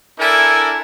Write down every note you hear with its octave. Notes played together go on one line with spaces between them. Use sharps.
D4 E4 A4 A#4 G#5